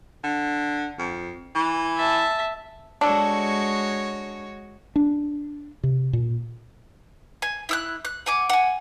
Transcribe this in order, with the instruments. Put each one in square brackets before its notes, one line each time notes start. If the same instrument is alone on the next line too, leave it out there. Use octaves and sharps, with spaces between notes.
[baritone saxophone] D3
F2
E3
[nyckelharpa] E5 A5
[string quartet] G#3 F#4 C#5 [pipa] D4 A4
[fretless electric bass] D4
C3
A#2
[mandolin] G#5
E4 E6 F#6
F#6
F#5 G#5 D6
F#5 G#5